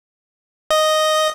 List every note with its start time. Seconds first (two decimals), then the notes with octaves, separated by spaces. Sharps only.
0.70 D#5